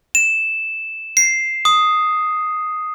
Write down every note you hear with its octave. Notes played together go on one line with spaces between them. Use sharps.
E7
C7
D#6